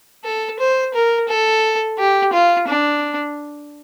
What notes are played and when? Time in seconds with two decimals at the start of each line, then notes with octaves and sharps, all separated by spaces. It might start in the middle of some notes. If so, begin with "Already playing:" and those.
0.25 A4
0.59 C5
0.94 A#4
1.29 A4
1.99 G4
2.33 F4
2.67 D4